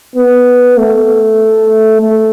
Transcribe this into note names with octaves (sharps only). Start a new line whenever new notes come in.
B3
A3
A3